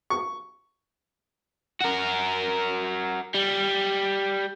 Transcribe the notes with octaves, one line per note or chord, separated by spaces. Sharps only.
C#6
F#4 A#4
G3